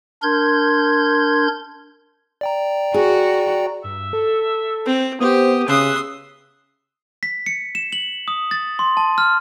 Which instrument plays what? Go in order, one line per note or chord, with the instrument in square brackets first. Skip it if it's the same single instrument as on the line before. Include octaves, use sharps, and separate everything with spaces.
[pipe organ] D4 A#4 C6 G6 G#6
[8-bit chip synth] D5 G5 A#5
[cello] F#4 [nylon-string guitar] G#4
[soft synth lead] G2 [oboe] E5
[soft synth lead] A4
[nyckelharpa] C4
[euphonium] B3 [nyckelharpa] G4 [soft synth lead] C5 [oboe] D#6
[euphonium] C#3 [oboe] E5 [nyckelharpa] C6 D#6 [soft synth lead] F#6
[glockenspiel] B6
C#7
E7
F#7
D#6
A6
C6
A5
F6